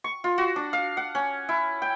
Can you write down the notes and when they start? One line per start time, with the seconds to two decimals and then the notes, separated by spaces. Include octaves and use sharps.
0.04 C#6
0.24 F4
0.38 F#4
0.56 D4
0.73 F5
0.97 F#5
1.15 C#4
1.49 E4
1.82 G5